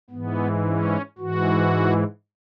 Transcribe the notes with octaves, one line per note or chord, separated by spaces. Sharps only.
G#2 E3 B3
C#4
G#2 E3 F#4